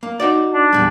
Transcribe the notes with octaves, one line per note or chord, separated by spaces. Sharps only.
A#3
D#4 F#4 D5
D4
E2 A#2 G3